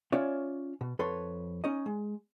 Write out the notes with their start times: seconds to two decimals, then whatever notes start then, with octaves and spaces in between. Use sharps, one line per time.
0.12 C#4 F4 C#5 D5 E5
0.81 B2
0.99 F2 A4 B4 C#5 C6
1.64 C#4 D#4 D#5
1.86 G#3